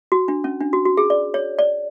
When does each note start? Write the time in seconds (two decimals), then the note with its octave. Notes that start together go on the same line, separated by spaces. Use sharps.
0.12 F#4
0.28 D4
0.44 C#4
0.61 D4
0.73 F#4
0.85 F#4
0.97 G#4
1.10 D5
1.34 C#5
1.59 D5